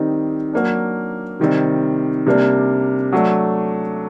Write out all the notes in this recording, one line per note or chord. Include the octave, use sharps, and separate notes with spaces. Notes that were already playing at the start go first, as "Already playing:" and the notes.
Already playing: D#3 G3 C4 D#4
F#3 A#3 D4
C3 D#3 G3 C4
C3 G3 A#3 D4
F#3 A3 D4